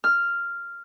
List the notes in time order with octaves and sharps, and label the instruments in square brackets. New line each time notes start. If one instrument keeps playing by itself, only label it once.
[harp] F6